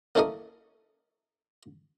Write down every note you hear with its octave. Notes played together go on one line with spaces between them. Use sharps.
A#3 C#4 E4 A4 A#4 D#5